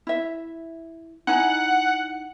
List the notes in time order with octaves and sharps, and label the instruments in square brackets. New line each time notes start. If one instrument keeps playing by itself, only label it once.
[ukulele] E4 E5
[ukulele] D#4 E4 G#5 [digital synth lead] F#5